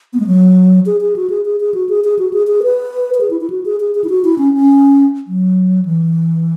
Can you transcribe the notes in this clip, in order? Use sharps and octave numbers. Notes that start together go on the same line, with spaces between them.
B3
G#3
F#3
G#4
G#4
F#4
G#4
G#4
G#4
F#4
G#4
G#4
F#4
G#4
G#4
B4
B4
G#4
E4
E4
F#4
G#4
G#4
G#4
E4
F#4
E4
C#4
C#4
F#3
E3